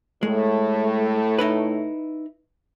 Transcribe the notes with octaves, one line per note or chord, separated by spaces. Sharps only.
A2 G#3 A3
D#4 E4 B4